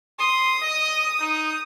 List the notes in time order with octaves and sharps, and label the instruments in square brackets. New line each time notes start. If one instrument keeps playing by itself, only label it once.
[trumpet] C6 [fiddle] D#6
[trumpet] D#5
D#4